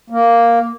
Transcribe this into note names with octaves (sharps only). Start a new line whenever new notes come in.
A#3